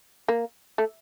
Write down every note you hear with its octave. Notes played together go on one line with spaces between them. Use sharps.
A#3
A3